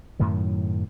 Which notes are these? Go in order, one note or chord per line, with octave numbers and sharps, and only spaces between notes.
F#2 A2 D#3 F#3